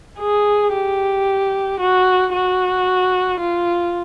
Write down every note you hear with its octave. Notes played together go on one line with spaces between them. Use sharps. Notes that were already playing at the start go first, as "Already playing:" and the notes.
G#4
G4
F#4
F#4
F4